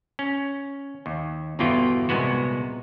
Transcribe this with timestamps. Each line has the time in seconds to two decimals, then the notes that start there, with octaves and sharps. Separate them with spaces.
0.19 C#4
1.06 D#2
1.59 G1 E2 B2 E3 F4 G5
2.09 C2 A#2 G#3 B3 F#4